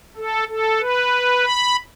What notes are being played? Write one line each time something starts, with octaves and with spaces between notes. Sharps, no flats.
A4
A4
B4
B5